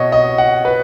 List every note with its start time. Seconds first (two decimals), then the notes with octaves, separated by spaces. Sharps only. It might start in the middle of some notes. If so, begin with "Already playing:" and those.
Already playing: B2 C#5 D#5
0.12 D#5
0.38 F#5
0.65 B4